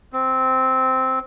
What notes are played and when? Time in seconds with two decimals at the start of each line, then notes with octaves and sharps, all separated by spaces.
0.13 C4